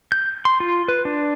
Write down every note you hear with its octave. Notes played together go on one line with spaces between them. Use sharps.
G6
C6
F4
B4
D4